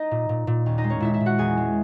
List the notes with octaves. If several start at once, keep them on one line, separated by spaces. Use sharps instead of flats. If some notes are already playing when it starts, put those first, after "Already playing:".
Already playing: D#4 D#5
A#2
A#2
A#2
D#2 C#4 C#5
D#4 D#5
G#3
C#4 C#5
A#2 E4 E5
E4 E5
A#2
F#4 F#5
E2 G#4 G#5
G#3